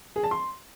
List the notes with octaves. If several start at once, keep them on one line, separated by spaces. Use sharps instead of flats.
G#4
A5
C6